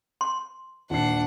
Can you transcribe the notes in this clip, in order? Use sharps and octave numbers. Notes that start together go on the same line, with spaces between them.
C6
D#1 D4 F#5 C7